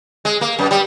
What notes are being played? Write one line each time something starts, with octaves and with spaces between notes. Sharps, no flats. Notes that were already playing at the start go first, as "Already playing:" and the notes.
G#3
A#3
F#2
G3